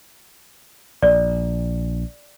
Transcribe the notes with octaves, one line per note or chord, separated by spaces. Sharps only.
A#1 D5